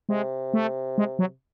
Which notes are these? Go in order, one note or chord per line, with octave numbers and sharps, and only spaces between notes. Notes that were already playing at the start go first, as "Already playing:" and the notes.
C3 G#3
A3
G#3
F#3